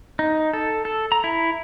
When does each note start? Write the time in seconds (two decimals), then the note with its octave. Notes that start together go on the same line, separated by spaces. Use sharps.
0.19 D#4
0.53 A4
0.85 A4
1.12 A#5
1.24 E4